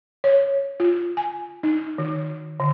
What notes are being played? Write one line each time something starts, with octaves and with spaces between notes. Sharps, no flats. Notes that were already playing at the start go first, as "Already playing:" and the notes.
C#5
F4
G#5
D#4
D#3
D3